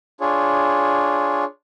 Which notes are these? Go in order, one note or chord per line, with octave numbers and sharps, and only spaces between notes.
D4 F4 G#4 C#5